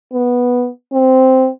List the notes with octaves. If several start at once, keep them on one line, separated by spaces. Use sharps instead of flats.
B3
C4